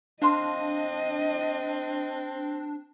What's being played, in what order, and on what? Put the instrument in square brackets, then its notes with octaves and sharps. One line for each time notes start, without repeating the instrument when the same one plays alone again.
[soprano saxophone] C4 [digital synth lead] D4 [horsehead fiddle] D#5 [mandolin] F5 C6